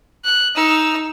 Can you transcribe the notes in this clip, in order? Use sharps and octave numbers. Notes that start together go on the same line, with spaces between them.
F#6
D#4 E6